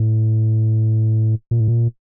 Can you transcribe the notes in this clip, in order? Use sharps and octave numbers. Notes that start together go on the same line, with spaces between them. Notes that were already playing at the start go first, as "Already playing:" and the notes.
Already playing: A2
A#2
A2
A#2